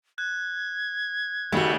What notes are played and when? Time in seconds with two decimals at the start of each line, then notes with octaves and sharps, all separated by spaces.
0.18 F#6 G#6
1.52 D#2 C#3 G3 A3 F#4